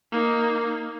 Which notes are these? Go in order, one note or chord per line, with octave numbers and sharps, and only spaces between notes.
A#3 D#4